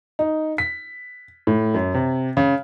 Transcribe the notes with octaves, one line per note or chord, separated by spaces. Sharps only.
D#4
B6
A2
F#2
C3
C#3